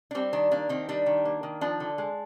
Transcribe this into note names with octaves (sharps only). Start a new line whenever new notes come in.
D4
G3 C4
D#3 D4
A#3 D4
D#3 C4
G3 D4
D#3
A#3
D#3
F3 D4
D3
G#3